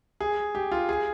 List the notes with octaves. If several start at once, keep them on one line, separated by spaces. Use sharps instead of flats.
G#4
G4
F4
G#4